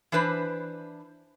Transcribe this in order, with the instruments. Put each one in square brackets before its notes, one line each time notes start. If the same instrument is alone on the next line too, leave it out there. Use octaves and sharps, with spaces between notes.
[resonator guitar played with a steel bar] E3 D4 B4 C5